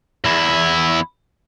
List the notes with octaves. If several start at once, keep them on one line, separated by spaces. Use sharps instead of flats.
E2 E4